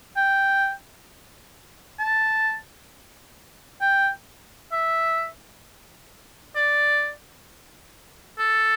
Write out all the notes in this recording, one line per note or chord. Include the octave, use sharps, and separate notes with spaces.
G5
A5
G5
E5
D5
A4